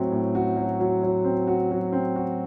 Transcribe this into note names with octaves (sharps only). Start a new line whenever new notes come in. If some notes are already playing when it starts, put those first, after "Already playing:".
Already playing: A2 F#3 C4
A2
F#4
F#3
F#3
F#3
C4
F#4
F#3
C4
F#4